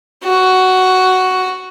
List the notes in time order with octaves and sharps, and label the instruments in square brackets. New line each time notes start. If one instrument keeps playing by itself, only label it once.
[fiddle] F#4